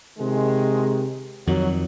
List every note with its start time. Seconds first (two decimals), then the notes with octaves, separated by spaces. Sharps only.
0.18 C3 D#3 G#3
1.47 F2 D#3 F#3